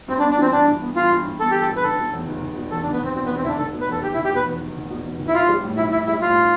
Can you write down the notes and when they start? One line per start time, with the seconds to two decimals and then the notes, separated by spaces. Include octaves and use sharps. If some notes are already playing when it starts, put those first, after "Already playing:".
0.08 G2 C4
0.19 D4
0.23 B3
0.31 D4
0.38 E3 C4
0.52 G2 D4
0.67 G2
0.82 B3
0.95 E3 F4
1.10 G2
1.25 G2
1.40 B3 A4
1.51 E3 G4
1.61 A4
1.69 G2
1.77 B4
1.83 F1 A4
1.99 B2
2.13 E2
2.27 F1
2.42 F1
2.57 B2
2.71 E2 A4
2.82 D4
2.86 F1
2.92 B3
3.01 F1 C4
3.14 B2 C4
3.25 B3
3.29 E2
3.36 C4
3.44 F1 E4
3.48 D4
3.58 F1 A4
3.73 B2
3.81 B4
3.88 E2 A4
4.02 F1 G4
4.14 E4
4.17 F1
4.25 G4
4.31 B2 B4
4.46 E2
4.61 F1
4.76 F1
4.90 B2
5.04 E2
5.19 F1
5.28 E4
5.33 B1 F4
5.49 G3
5.63 A2
5.77 B1 E4
5.92 B1 E4
6.06 G3 E4
6.22 A2 F4